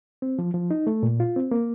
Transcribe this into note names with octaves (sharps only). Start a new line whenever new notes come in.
C4
F3
F3
D#4
A3
A#2
F4
C4
A#3